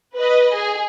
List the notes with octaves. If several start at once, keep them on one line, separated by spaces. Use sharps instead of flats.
B4 D#5
G#4